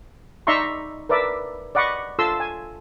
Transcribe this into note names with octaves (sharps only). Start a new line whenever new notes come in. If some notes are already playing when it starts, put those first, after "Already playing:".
D#4 D5 E5 A#5 C6 C#6
A#4 B4 D5 E5
D5 D#5 F#5 B5 C#6
F4 A4 A5 C6 E6
G#5